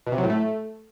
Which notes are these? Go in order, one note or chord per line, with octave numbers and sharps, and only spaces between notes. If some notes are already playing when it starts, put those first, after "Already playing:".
B2
C3
F#3
A2
A3